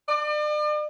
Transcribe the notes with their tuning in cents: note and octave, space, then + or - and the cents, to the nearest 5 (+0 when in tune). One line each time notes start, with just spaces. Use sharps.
D5 +40